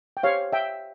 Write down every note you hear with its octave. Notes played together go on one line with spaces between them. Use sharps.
G5
G4 C5 C#5 F5
E5 G5